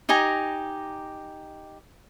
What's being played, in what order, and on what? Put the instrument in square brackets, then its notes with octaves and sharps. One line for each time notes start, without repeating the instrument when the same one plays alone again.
[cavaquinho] D#4 G4 G#5 A#5